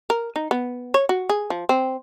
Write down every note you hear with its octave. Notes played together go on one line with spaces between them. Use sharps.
A#4
D#4
B3
C#5
F#4
G#4
F3
C4